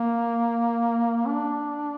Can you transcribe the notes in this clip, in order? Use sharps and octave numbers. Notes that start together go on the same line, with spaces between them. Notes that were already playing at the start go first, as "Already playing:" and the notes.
Already playing: A#3
D4